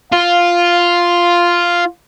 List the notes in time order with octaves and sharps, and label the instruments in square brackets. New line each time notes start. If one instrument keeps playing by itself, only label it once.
[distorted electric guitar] F4 [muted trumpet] F5